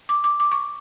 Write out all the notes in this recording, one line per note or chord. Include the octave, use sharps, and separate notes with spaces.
D6
D6
D6
C#6